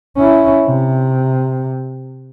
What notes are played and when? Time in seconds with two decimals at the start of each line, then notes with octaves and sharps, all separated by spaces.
0.16 C#4 E4
0.66 C3